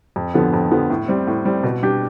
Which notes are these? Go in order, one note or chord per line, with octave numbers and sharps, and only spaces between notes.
F2
D3 F3 B3
F2
D3 F3 B3
A2
G3 C4
A2
G3 C4
B2
G3 D4 G4